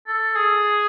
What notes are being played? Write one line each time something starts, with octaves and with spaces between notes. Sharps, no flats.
A4
G#4